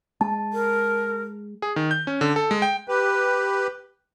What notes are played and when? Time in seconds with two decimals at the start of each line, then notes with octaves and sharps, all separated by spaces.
0.21 G#3 A5
0.53 A#4
1.62 G#4
1.76 D#3
1.91 G6
2.07 C#4
2.21 D3
2.36 A4
2.51 G#3
2.62 G5
2.88 G4 B4